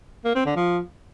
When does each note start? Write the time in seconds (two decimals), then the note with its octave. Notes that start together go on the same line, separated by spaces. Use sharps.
0.25 A#3
0.35 C4
0.46 D3
0.56 F3